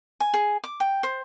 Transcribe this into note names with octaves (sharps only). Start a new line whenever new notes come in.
G#5
G#4
D6
G5
C5